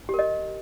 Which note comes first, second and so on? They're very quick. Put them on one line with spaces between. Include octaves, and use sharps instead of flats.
G4 A#4 D#5